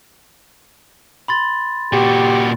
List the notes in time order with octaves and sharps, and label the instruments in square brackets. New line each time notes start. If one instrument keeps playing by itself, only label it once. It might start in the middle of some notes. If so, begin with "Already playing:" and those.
[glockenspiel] B5 C6 A6
[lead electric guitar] A#2 F#4 [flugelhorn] G4